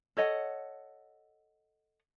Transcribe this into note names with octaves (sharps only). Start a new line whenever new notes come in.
A4 C#5 D#5 F#5